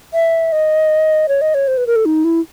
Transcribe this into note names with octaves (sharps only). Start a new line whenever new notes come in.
E5
D#5
C#5
D#5
C#5
C5
B4
A#4
A4
D#4
E4